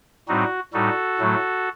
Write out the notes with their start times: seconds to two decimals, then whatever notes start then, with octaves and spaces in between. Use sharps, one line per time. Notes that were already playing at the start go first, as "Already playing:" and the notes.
0.28 A2 G3 C4 D#4 F#4
0.73 A2 G3 D#4 F#4 A4
1.19 A2 F#3 A3